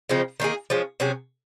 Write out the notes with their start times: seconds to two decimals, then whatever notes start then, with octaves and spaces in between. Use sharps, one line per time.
0.09 C#3 F3 C4 D#4
0.40 D#3 A#3 D#4 G#4
0.70 F3 G#3 C#4
1.00 C3 F#3 C#4 G#4